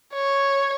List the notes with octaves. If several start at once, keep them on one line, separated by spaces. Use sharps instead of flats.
C#5